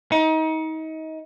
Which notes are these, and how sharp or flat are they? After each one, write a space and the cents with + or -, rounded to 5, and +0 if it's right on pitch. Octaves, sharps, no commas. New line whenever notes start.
D#4 +30